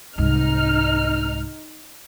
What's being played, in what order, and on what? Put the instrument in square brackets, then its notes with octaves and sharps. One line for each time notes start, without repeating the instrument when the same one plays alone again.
[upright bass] C2 G#2 [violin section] D#4 F6